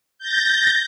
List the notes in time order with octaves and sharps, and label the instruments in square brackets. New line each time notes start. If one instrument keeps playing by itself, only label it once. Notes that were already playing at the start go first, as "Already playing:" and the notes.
[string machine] G6 A6 A#6